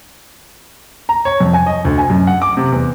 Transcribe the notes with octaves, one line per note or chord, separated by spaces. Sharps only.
A#5
C#5
F2
G#5
D#5
D2
G#5
F#2
F#5
D6
C3
E2